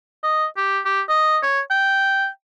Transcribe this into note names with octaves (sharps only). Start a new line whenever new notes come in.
D#5
G4
G4
D#5
C#5
G5